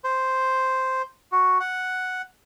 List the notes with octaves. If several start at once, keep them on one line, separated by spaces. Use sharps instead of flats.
C5
F#4
F#5